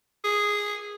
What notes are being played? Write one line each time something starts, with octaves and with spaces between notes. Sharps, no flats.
G#4